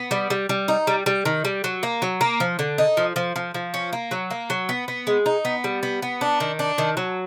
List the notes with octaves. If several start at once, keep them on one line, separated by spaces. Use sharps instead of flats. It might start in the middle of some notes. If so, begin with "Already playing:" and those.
Already playing: B3
G3
G3
G3
D#4
G3
G3
D#3
G3
F#3
A#3
F#3
A#3
F3
D3
D#4
F3
F3
F3
F3
C#4
A#3
F#3
A#3
F#3
B3
B3
G#3
D#4
B3
G3
B3
B3
D4
D#3
D4
D#3
F#3